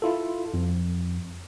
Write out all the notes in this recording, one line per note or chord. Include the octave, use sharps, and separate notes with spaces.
E4 F4 A4
F2